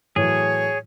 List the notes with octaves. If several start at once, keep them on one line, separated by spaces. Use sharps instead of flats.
A2 E3 F#3 G#4 C#5